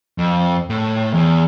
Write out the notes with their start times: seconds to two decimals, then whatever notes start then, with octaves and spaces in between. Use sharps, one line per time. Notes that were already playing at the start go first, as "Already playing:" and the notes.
0.18 F2
0.70 A2
1.14 E2